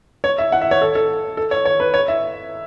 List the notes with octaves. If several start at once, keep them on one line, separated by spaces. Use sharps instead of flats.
C#5
E5
F#5
E5
C#5
A4
A4
A4
C#5
C#5
B4
C#5
E5